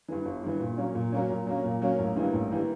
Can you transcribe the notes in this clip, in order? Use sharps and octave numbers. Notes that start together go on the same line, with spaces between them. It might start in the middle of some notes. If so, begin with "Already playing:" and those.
G2 E3
G1
G2 E3
A#2
F#3 A#3 C#4
A#2
F#3 A#3 C#4
A#2
F#3 A#3 C#4
A#2
F#3 A#3 C#4
A1
G2 E3 G3 A#3
A1
E3 G3 A#3